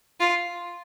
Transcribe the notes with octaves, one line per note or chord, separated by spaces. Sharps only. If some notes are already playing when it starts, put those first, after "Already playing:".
F4